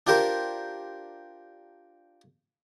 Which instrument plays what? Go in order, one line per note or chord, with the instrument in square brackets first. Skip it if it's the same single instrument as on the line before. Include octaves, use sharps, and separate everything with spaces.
[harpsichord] D4 F4 G4 A#4 C5